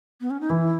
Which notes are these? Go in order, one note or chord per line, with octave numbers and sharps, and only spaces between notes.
B3
C#4
D#4
E3 E4